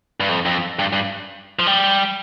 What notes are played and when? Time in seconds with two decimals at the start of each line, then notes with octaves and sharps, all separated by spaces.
0.20 G2
0.29 F2
0.46 F2
0.79 G2
0.93 G2
1.59 F3
1.67 G3